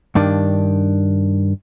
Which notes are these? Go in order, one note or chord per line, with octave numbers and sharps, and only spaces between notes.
G2 D#3 D4